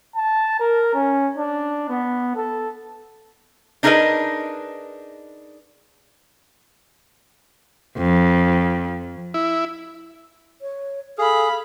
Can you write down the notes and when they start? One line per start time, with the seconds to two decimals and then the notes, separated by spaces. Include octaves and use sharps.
0.16 A5
0.60 A#4
0.94 C#4
1.37 D4
1.89 B3
2.36 A4
3.83 D4 D#4 G#4 A#4 B4 D#5
7.98 F2
9.34 E4
10.62 C#5
11.18 G#4 A4 F5 B5